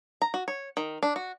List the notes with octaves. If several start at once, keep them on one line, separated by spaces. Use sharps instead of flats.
A#5
F#4
C#5
D#3
D4
F#4